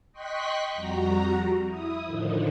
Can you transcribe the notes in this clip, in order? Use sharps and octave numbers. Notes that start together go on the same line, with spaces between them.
D#5 G5 C6 C#6 F#6 B6
F2 G3 F#4 A#5
E4 D#6
A2 D3 D#3 F3